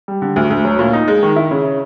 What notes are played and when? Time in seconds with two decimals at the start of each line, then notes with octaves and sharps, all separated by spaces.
0.08 G3
0.22 D3
0.36 D2
0.50 D2
0.65 F#3
0.79 A#2
0.93 D#4
1.08 G#3
1.23 D#3
1.36 E4
1.51 C#3